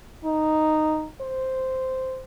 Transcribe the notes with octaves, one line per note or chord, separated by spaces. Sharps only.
D#4
C5